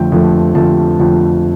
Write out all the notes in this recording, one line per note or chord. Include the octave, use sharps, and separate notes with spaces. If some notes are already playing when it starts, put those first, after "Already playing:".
Already playing: F2 D3 F3 A3 G5
F2 D3 F3 A3
F2 D3 F3 A3 A5
F2 D3 F3 A3